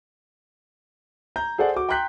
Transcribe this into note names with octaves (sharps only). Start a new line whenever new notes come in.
A#5 G6
G#4 A4 C5 D5 F#5
F#4 D6
G5 A#5 C6 F#6 G6 B6